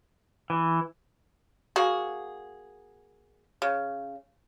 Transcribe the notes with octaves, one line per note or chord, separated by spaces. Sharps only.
E3
A#3 F#4 G#4
C#3